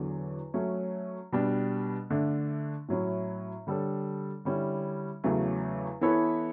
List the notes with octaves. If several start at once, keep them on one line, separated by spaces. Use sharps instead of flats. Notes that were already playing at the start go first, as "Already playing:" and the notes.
Already playing: E2 D3 F#3
F#3 A3 C#4
B2 G3 D4
D3 A3 D4
A2 F#3 C#4 E4
D3 G3 D4 A4 C#5
D3 G3 C#4 E4
E2 C#3 F#3 A3
E3 B3 E4 A4 C#5